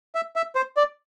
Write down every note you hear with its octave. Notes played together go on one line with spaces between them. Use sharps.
E5
E5
C5
D5